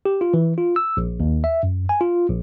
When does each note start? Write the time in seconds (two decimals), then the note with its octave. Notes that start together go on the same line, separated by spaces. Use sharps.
0.05 G4
0.21 F4
0.34 E3
0.58 F4
0.76 E6
0.97 A#1
1.20 D#2
1.44 E5
1.63 F#2
1.89 G#5
2.01 F4
2.29 A#1